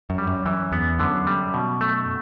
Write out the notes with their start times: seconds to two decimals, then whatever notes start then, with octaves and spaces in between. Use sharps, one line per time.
0.10 F#2
0.18 G3
0.27 F#2
0.46 F#2 E3
0.72 E2 B3
0.99 F#2 D3
1.27 G3
1.54 B2
1.81 A3